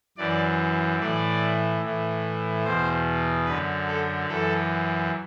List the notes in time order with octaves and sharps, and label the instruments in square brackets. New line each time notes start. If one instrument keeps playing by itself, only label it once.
[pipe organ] F#2 E3 D5
A2 E3 D5
A2 E3
E2 B2 C5
F#2 D3 B4
A4
F#2 E3 A4